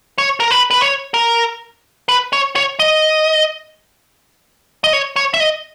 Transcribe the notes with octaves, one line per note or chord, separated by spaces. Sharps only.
C#5
A#4
B4
B4
C#5
A#4
B4
C#5
C#5
D#5
D#5
C#5
C#5
E5
D#5